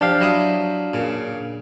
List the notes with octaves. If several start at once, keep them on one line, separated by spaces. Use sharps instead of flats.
F3 D4 G4 F5
F#3 E4 D#6
A#2 C#3